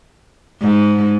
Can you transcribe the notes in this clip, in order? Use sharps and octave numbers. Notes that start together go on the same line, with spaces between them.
G#2